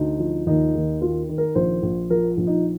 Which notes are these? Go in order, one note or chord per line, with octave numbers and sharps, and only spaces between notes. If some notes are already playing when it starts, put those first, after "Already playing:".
Already playing: D2 D#4
F3
D#2 D#4
D#2
D#3 F4
D#3
A#4
A#1 C5
A#1
F3 A#4
A#1
D#4